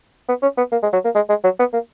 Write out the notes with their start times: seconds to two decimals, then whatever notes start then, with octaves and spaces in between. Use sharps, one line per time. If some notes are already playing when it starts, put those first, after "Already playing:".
0.29 B3
0.42 C#4
0.58 B3
0.72 A#3
0.83 G#3
0.93 F#3
1.05 A#3
1.15 G#3
1.29 G#3
1.44 F#3
1.59 B3
1.73 A#3